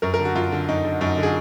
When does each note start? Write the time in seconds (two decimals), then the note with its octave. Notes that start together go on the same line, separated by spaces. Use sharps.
0.02 F#2 A#4
0.14 A#4
0.19 D3
0.25 F#4
0.35 F#2 F4
0.52 D3
0.68 F#2 D#4
0.85 D3
1.01 F#2 D#4
1.17 D3
1.23 G#4